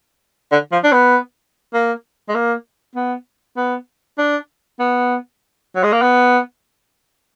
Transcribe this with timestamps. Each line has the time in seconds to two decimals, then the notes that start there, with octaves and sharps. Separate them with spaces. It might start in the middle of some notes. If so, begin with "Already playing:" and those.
0.52 D3
0.72 F3
0.84 D4
0.92 B3
1.74 A#3
2.29 G#3
2.35 A#3
2.95 B3
3.57 B3
4.18 D4
4.79 B3
5.75 F#3
5.84 G#3
5.93 A#3
6.02 B3